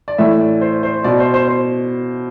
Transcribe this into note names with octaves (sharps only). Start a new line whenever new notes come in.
D5
A2 E3 E5
D5
C5
C5
B2 D5
C5
C5
C5